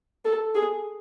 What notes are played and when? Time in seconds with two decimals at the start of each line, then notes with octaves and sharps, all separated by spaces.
0.25 A4
0.55 G#4